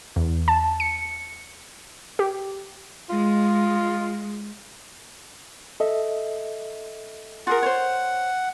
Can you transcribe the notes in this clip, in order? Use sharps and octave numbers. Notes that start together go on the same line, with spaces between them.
E2
A5
C#7
G4
G#3 F4
A4 D#5 E5
F4 G#4 A#4 F#5
C5 C#5